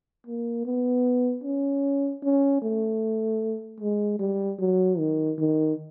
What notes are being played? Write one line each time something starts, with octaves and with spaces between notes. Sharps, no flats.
A#3
B3
C#4
C#4
A3
G#3
G3
F#3
D#3
D#3